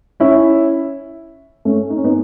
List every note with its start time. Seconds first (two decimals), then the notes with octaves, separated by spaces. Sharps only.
0.20 C#4 E4
1.65 A3 C#4
1.90 D#4
1.97 C#4
2.04 B3 D#4